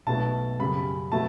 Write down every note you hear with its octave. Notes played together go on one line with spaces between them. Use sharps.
B1 B2 A3 A5
F#2 C#3 G3 B5
B2 F#3 A3 A5